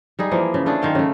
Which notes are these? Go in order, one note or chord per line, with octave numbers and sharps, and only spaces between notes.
G3 D#4 G#4
E3 F3 A#3
C#3
A3 D4 G#4
D#3 C5 F5 G5
C#3 A3